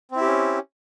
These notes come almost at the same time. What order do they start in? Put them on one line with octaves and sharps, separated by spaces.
C4 E4 G4 C#4